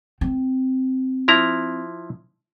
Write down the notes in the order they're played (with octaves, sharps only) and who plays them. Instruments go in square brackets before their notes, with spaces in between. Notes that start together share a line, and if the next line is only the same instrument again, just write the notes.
[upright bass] C4
[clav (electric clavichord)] F3 E4 A#5